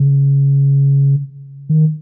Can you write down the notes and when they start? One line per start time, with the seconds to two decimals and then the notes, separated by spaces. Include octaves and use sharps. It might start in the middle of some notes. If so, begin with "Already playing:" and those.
Already playing: C#3
1.69 D#3